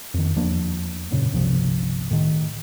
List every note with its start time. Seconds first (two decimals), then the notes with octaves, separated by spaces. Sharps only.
0.14 F2 D#3
0.36 E2 F3 A#3 D4
1.11 E1 F#2 A#2 C#3
1.32 G1 C2 C3 F3
2.11 A2 D#3